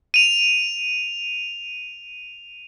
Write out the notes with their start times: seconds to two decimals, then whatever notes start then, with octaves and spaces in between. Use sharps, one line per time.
0.14 D#7 F7